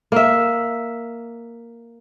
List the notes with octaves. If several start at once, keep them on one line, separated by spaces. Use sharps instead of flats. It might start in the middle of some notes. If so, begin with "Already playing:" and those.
A#3 E5